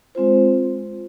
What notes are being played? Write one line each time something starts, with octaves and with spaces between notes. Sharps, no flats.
G#3 C4 F4 C5